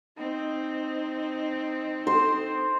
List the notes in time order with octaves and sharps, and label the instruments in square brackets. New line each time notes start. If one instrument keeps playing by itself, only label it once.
[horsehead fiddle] C4 D#4
[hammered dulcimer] C5